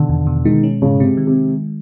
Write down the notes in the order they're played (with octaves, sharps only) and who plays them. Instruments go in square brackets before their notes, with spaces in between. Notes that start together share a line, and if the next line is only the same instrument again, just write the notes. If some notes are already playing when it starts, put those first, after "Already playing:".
Already playing: [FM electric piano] B2 D#3 [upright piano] D3
[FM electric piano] E2
B2
[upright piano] D#3 [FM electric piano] G#3
[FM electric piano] C#4
[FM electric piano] G#2 [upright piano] C#3
[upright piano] C3 [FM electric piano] G#3
[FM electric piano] D#3
[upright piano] C3